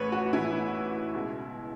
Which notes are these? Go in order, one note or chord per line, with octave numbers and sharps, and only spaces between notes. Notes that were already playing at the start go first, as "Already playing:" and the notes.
Already playing: A1 A2 E3 B4 C#5
F#4
A1 A2 E3 E4
C#2 B2